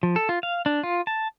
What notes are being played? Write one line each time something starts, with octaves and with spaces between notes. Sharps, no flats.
F3
A4
F4
F5
D4
F4
A5